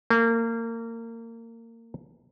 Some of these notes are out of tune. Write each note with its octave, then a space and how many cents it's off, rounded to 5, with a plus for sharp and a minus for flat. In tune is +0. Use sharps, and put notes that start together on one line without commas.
A#3 -25